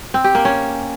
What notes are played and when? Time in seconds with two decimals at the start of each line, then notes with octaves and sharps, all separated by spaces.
0.14 C4
0.24 G4
0.35 A#3
0.45 C#4